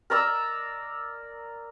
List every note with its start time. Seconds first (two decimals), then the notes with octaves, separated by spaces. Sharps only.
0.10 A#4 D5 A#5 E6